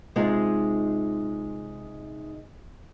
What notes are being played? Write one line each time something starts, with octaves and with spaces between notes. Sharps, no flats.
C3 G#3 D#4 F4 G#4 D#5